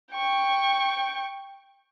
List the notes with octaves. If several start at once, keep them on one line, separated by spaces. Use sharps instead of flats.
G5 C#6